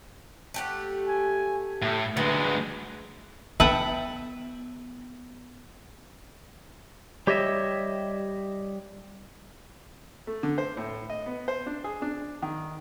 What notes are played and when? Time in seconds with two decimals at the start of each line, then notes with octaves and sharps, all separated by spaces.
0.54 A3 G4 F#5
1.08 G#5
1.82 A2 E5
2.17 D2 G#3 F#4 B4
3.60 B3 B4 E5 F#5 G5 A5
7.27 G3 G4 C#5 D#5 E5
10.27 A3
10.43 D3
10.58 C5
10.77 A2
11.10 D#5
11.26 B3
11.48 C5
11.66 D4
11.84 G#4
12.02 D4
12.42 D#3